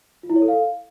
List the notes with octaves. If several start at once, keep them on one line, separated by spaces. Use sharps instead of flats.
F4
E4
C#5
A4
F5